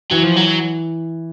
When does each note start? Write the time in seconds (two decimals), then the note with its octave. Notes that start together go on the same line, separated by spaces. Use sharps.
0.11 E3 F#3
0.24 F3
0.36 F#3